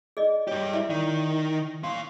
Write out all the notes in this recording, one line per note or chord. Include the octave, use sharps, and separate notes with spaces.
G#4 D5 D#5
G2 G4 C#5
E4 D5 E5
D#3
A#2 F5 C6 C#6